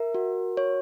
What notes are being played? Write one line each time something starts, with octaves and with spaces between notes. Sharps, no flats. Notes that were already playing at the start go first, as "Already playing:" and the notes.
Already playing: A#4 E5
F#4
C#5